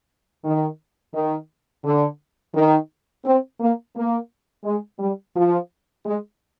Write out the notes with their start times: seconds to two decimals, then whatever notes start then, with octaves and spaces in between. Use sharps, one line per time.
0.45 D#3
1.14 D#3
1.84 D3
2.55 D#3
3.25 C4
3.60 A#3
3.95 A#3
4.65 G#3
4.99 G3
5.36 F3
6.06 G#3